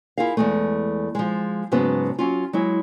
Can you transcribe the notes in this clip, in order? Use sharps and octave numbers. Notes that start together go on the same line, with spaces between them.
E4 F4 G#4 A#4 F5
E2 G#3 A3
F3 G#3
G#2 C#3 F#3 B3 A5
F#3 C#4 F4
F#3 G#3 E4